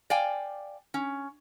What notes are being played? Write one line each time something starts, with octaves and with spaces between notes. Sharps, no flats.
D5 F5 G5 G#5
C#4